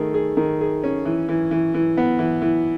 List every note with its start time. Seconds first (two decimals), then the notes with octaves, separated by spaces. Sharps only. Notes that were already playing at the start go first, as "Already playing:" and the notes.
Already playing: D#3 A3 G#4
0.14 G#4
0.37 D#3
0.61 G#4
0.84 C#4
1.05 E3
1.29 E3
1.51 E3
1.74 E3
1.97 B3
2.19 E3
2.42 E3